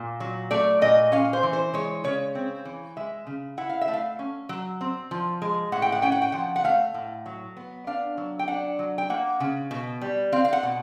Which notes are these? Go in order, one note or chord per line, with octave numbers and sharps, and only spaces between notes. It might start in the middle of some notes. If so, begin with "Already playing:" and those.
Already playing: A#2
F#3
A3 D5
A#2 D#5
C#4 F5
C5
E3
C5
G#3 C#5
C#3 C#5
C4
E3
G#3 E5
C#3
E4 F#5
F5
E5
A3
F5
C#4
F#3
C4
F3
G#3
A2 F#5
G5
F#5
C#4 G5
F#5
G5
F3 F#5
F#5
A3 F5
A2
F#3
B3
D4 F5
F#3
G5
D4 F#5
F#3
G5
A#3 F#5
C#3
B2
G3
C4 F5
F5
F#5
B2